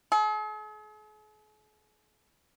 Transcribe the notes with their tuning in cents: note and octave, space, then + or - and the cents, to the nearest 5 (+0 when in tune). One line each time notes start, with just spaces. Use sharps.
G#4 +45